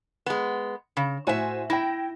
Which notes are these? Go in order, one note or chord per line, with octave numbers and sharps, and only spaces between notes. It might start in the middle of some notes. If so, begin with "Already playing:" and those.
G#3 B3
C#3
A2 F#4 C5 E5 G#5
E4 G5 A#6